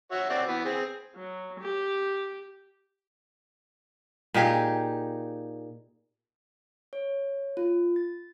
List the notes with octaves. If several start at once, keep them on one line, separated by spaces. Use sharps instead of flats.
F#4 C#5 E5
C4 F#4 D5
E3 B3
C4 G#4
F#3
G4
A#2 D#4 G4 G#4
C#5
F4
A6